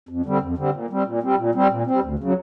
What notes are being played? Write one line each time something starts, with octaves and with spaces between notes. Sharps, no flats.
F2
D3 G3 C4
F2
D3 G3 C4
A#2
G3 C4
A#2
G3 C4
A#2
G3 C4
A#2
G3 C4
D2
C#3 F#3